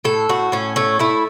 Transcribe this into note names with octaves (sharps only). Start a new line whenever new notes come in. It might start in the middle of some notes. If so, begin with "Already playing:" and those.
A2 A4
A2 F#4
A2 C#4
A3 C#4
A3 E4